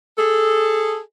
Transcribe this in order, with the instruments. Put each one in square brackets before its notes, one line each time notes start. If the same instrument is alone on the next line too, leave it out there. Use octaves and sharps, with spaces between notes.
[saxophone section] G#4 A4